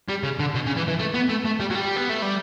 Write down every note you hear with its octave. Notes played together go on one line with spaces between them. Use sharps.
G3
C#3
D3
B2
C#3
E3
E3
A3
B3
A3
A3
G3
F#3
G3
B3
A3
G3